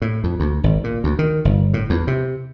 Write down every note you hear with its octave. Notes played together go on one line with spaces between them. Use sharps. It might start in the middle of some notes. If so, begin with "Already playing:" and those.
A2
F2
D2
G#1
A#2
D2
D#3
G1
A2
E2
C3